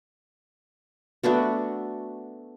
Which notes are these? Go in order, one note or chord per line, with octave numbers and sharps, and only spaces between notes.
A3 B3 D4 F#4